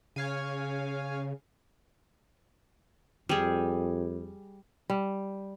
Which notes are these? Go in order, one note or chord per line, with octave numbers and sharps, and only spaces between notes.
C#3 C#5 F5 G#5
F2 G3 G#4
G3